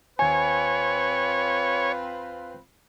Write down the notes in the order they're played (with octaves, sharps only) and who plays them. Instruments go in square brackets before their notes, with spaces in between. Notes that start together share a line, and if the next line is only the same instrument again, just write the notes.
[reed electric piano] D#2 G#5 [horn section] C4 F4 B4 [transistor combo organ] C#5